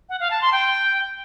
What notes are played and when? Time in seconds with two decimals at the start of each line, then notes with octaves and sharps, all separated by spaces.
0.09 F#5
0.20 F5
0.31 A5
0.41 C6
0.52 G5